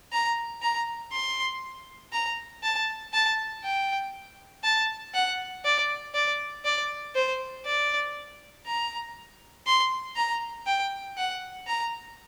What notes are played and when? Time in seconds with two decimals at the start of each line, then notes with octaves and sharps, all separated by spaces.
0.12 A#5
0.62 A#5
1.12 C6
2.12 A#5
2.63 A5
3.13 A5
3.63 G5
4.64 A5
5.14 F#5
5.64 D5
6.14 D5
6.65 D5
7.15 C5
7.65 D5
8.66 A#5
9.66 C6
10.16 A#5
10.66 G5
11.17 F#5
11.67 A#5